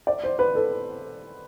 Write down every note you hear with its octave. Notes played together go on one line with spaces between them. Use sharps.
D5
C5
B4
A4